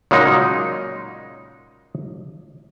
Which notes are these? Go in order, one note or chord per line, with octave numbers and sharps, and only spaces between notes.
A#2 C#3 F#3 G#3 D#4